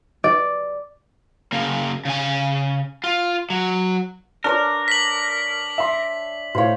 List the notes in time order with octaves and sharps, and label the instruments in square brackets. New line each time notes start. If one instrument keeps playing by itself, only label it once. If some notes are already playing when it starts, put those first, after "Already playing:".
[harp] D5
[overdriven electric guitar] C#3 A#3
C#3 G#5
F4
F#3
[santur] D4 C#5 D5 [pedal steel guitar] A#4
[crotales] B6 F#7
[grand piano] E5 C6
[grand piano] A2 F5 [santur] C5 C#5